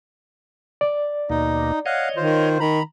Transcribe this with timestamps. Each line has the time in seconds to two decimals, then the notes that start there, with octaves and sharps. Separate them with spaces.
0.81 D5
1.30 D#2 B2 A#3 D#4
1.86 C#5 D#5 F5 F#5
2.16 D#3 F4 C5
2.60 D#3 A#5 B5